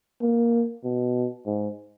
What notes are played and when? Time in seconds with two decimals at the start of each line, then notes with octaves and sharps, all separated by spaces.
0.22 A#3
0.84 B2
1.46 G#2